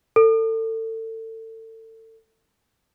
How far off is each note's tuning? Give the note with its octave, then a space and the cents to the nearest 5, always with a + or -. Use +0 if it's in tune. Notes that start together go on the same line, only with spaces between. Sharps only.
A4 +30